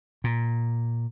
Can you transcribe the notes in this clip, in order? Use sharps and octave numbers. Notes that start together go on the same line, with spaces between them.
A#2